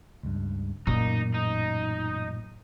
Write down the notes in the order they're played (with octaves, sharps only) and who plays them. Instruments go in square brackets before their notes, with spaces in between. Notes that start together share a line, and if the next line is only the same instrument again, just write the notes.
[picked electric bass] C#2 G2
[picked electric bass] A1 F#2 [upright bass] A#2 [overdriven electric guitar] D#4
[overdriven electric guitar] D#4